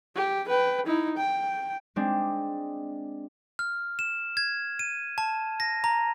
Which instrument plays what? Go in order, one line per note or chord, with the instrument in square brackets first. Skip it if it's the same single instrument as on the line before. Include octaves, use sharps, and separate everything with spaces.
[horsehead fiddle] G4
B4 G5
D#4 E4
G5
[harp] G#3 C4 D4
[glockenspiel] F6
E7
G#6
D#7
A5
A#6
A#5